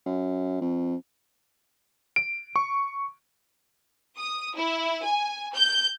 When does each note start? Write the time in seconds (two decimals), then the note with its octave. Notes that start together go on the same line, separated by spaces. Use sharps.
0.06 F#2
0.61 F2
2.16 D7
2.56 C#6
4.18 D#6
4.55 E4
5.04 G#5
5.54 G6